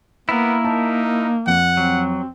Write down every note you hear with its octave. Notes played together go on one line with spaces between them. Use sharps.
A#3 B3 E4 A#4
D#4 A5
F2 F#5
F#3 C4